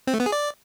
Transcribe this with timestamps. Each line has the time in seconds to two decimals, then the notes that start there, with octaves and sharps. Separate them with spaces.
0.07 C4
0.14 A3
0.20 B3
0.26 G#4
0.32 D5